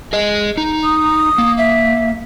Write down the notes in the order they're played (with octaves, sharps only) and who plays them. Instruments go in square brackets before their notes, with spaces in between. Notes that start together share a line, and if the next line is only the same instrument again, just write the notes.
[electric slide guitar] G#4 D#5
D#4
[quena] D#6
[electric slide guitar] A#3
[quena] E5